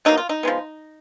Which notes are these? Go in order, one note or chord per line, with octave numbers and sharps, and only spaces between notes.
B2 F#3 A#3 D#4
F4
D#4
F3 G#3 B3